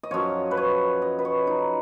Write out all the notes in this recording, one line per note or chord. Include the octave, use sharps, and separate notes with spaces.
D#5
F#2 F3 C#5
B4
C#5
D#5
B4
C#5
D#4